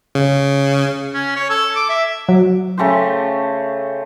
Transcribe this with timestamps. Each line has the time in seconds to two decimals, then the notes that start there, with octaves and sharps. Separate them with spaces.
0.15 C#3
1.14 C#4
1.36 C#5
1.50 A4
1.76 D6
1.89 E5
2.28 F#3
2.77 C#3 A3 G4 C5